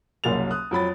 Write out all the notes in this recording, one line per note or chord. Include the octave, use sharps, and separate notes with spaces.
F#1 C2 F#3 A#3 A6 F7
D#6 F#6
F2 F#3 B5 A6